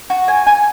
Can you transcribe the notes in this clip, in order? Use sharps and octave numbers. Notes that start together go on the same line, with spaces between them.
F#4
G#5
G#5